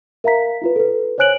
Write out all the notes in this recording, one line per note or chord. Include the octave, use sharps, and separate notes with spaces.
A#4 E5 F5 A#5 B6
E4 F4 B4
A4 B4
C5 C#5 G#5 F#6 D7 F#7